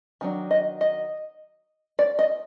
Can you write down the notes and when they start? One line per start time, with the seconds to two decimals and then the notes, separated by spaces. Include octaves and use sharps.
0.21 D#3 F#3 D4
0.51 D#5
0.81 D#5
1.99 D5
2.19 D#5